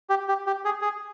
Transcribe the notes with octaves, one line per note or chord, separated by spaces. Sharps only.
G4
G4
G4
G#4
G#4